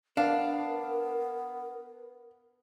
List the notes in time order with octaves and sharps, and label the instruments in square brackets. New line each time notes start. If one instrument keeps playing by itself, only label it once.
[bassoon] B3 [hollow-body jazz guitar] D4 [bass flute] A#4 [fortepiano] F5